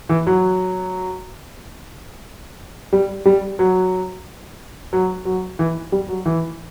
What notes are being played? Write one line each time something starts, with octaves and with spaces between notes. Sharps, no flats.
E3
F#3
G3
G3
F#3
F#3
F#3
E3
G3
F#3
E3